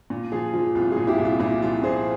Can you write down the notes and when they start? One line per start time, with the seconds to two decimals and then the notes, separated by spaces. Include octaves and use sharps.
0.10 A#2
0.32 F3 F4 G#4
0.53 F3 F4
0.75 C2 F4
0.92 F4 G#4
0.97 A#2
1.07 E4 G4
1.18 C2
1.25 F4
1.40 A#2 E4
1.62 F3 F4
1.83 A#2 G#4 C5